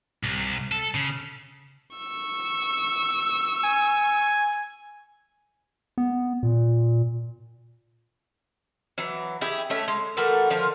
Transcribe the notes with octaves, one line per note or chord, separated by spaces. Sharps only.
C2
A4
C#3
C#6 E6
G#5
B3
A#2
E3 F#3
E4 G4 G#4
A3 C#4 E5
G#3
E3 A3 F#4 A#4
D3 F3 F4 A#4